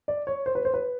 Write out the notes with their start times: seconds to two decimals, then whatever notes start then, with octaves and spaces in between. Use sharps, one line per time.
0.08 D5
0.27 C#5
0.46 C5
0.55 B4
0.65 C5
0.74 B4